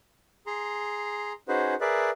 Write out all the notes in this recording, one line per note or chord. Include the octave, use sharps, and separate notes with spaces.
G#4 A#5 C6
C#4 D#4 F#4 G#4 B4 C5
G#4 A#4 B4 D5 E5